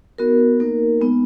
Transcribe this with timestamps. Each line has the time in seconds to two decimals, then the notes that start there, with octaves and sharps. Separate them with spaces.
0.18 B3 D#4 F#4 A#4
0.60 A#3 D#4 A#4
1.01 G#3 B3 D#4